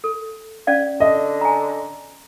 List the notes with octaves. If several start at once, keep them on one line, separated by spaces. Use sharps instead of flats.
A4
C#4 D5 F5
D3 D#5
G#5 A#5